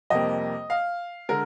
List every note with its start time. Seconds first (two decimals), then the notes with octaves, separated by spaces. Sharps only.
0.10 F2 C3 G3 A#3 D#5
0.70 F5
1.29 D3 G#3 A#4